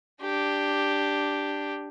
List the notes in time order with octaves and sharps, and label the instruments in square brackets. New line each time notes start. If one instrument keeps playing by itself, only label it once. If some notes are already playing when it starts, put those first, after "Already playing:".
[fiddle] D4 G4